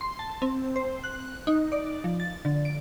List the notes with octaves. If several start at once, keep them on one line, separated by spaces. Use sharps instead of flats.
C6
A5
C4
C5
F#6
D#4
D5
F3
A6
D3
D7